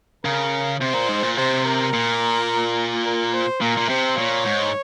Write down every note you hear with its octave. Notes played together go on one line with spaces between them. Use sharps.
C#3 A#4
C3 C5
A#2
G#2
A#2
C3 C5
A#4
A#2
A#4
C5
A#2 A#4
A#2
C3 C5
A#2 C#5
G#2